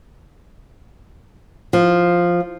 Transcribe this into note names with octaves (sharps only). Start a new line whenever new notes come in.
F3